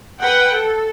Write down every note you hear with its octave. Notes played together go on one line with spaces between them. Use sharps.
B4 F#5 G5
A4